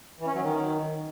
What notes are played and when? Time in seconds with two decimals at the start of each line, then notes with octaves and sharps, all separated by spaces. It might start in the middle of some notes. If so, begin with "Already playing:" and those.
0.19 E3
0.27 C#4
0.34 F#3
0.41 D#3